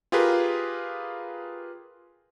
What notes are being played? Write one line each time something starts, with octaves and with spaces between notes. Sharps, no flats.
F4 G4 G#4 A#4 B4